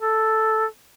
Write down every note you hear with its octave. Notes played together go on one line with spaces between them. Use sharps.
A4